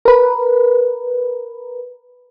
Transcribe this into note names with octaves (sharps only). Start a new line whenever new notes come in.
A#4 B4